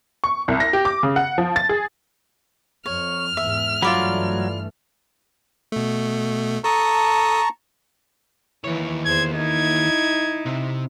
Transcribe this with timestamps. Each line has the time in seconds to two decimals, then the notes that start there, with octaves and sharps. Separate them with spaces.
0.24 C#6
0.48 C2
0.60 A#6
0.73 G4
0.85 D6
1.03 C#3
1.16 F#5
1.38 F3
1.56 A6
1.69 G#4
2.86 F2 C#5 F6
3.37 E2 G#2 E5
3.82 G2 E3 F#3 A3 F4 D5 B5
5.72 B2 A3
6.64 A4 A5 A#5 C#6 D#6
8.64 D#2 E3 C#5
9.05 E2 C5 G#6
9.35 D#4 E4 G#6
10.45 C3